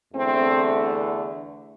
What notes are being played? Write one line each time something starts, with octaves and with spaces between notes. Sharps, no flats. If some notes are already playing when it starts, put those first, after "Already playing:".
E2 D3 A3 C4